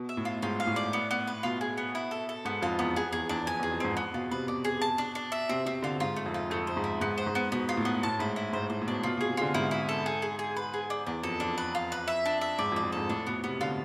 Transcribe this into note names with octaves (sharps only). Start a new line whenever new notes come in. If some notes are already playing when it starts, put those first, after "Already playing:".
Already playing: B2
E5
A2
F4
G#2 F4
F5
A2
D5
B3
B3
B4
B2 F4
G#4
B3
E4
A4
A4
G#2 B3
F2 F4
E2 B3
G#4
E2 G#4
E2 D4
F2 G#5
E2 G#4
F2
G#2 C4
B3
B2 F4
C3 B4
B2 D5
G#4
A5
D4
D4
E5
C3 C4
C3 C4
D3 F4
G#2 F4
A3
F2
F4
F2 A3
C5
G#2
E4
G#2 B3
C5
G#2
B3
B2 B3
F4
A2
B3
A2 A5
G#2 E4
E4
G#2 C5
A2 C5
A2
B2 D4
B2 F4
B2 G#4
C3
D3 F4
G#2 E4
E4
A4
G#4
G#4
G#4
B4
G#4
D4
E2 D4
F2 A4
F2 D4
B4
F4
B4
E5
D4
E5
G#2 D5
F2
D5
F2
G#2 A4
A2 D4
B2 B3
C3 B3
D3 F4